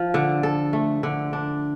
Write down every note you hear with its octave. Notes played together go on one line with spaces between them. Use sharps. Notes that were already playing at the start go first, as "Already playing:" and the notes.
Already playing: F3
D3
A4
A3
D3
D4